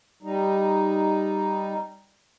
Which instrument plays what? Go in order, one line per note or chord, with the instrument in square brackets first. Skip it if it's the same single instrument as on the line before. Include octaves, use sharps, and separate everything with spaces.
[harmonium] G3 D#4